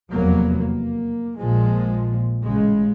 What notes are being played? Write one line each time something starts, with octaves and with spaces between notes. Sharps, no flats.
F1 E2 F#3 A#3 B3
A#3
A#1 A#2 F3 G#3
A1 C#3 G#3